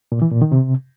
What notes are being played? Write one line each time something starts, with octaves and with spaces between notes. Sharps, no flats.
A#2
E3
A#2
D#3
C3